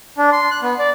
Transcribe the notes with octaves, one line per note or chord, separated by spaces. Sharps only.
D4
C6
F#6
B3
D5